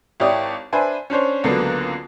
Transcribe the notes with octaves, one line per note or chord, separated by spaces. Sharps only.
G#1 E4 G4 C#5 D5 D#6
D4 B4 C5 E5 G#5
C#4 D4 C5 C#5
C#2 D3 F#3 A#3 B3